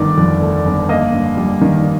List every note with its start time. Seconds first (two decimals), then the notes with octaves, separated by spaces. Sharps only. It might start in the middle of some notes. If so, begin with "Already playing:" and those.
Already playing: G1 D#3 A3 D5
0.17 F2
0.42 A3
0.65 G1
0.89 A#3 D#5
1.13 G2
1.37 G3
1.61 D#3